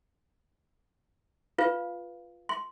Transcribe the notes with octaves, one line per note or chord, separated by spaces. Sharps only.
F4 B4 F5
C6